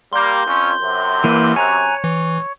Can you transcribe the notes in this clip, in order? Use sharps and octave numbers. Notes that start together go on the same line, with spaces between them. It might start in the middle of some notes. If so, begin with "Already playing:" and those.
G3 A#3 C6 G6
F2 C#4
F#2 C3
E3 A#3 B4
C#5 G#5 A#5 F#6
E3